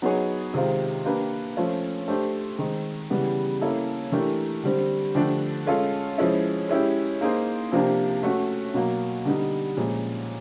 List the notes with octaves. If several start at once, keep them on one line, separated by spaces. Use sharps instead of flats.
F#3 B3 D#4 G#4 C#5
C3 D#3 G#3 C4 F4
A#3 D4 G4 B4
F3 A3 C#4 F4
A3 D4 G4 C5
D#3 G#3 C4
C#3 E3 G3 B3
A#3 C#4 E4 A4
E3 A3 D4 G4 A#4
D3 G3 C4
D3 F3 A3 D4 G4
G#3 C#4 F4 A4
F3 G#3 C#4 E4
G#3 C#4 E4 G4
A#3 D#4 G#4 C5
C3 F3 A#3 D4 G4
A3 C#4 F#4
B2 F#3 A#3
D3 G3 B3 D#4
A#2 F3 G#3 C#4